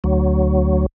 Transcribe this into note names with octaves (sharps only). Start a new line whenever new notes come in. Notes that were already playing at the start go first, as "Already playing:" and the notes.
D2 F#3